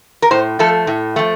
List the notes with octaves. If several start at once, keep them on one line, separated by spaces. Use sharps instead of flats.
A#4
A2 C5
F3 A3 A4
A2
F3 A3